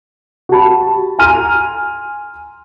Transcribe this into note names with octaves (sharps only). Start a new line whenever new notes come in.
F#4 G4 A5 B5
G#5 A#5 C6 F6 D#7